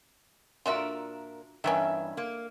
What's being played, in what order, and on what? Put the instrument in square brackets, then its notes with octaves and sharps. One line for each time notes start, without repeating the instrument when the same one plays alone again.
[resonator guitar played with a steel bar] A#2 D4 A#4 [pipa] F4 F#4 E5
[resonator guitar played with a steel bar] G2 E3 E5 [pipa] D#3 B3 C#4
[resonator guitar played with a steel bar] A#3